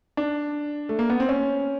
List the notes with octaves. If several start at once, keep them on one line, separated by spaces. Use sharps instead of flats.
D4
A3
A#3
B3
C4
C#4